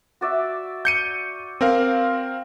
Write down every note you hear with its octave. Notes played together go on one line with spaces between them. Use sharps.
F#4 D5 E5
G6 C#7 D#7
C4 A#4 F5